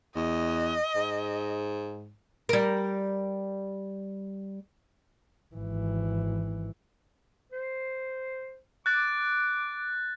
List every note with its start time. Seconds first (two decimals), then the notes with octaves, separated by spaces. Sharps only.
0.16 E2 D#5
0.96 G#2
2.49 G3 A#4
5.56 G#1 E3
7.52 C5
8.86 D6 F#6 A6